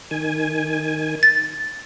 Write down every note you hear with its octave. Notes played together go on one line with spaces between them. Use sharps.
D#3 G#5
A6